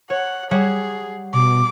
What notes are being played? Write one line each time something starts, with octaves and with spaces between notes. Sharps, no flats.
C#5 F#5
G3 G#4 C#5 F#5
B2 D6